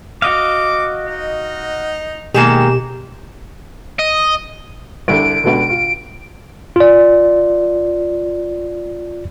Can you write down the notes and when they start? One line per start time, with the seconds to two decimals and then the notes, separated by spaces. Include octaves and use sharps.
0.22 F#4 D#5 F5 D6
1.05 D#4
2.34 B2 D#3 G#3 A#3 G4 E7
3.99 D#5
5.08 C2 D3 D7
5.44 C#2 B2 D3
5.70 F4
6.76 F4 D5